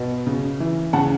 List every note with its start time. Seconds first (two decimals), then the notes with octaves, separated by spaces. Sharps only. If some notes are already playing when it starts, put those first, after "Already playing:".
Already playing: B2
0.27 C#3
0.60 E3
0.93 C#3 F#5 A5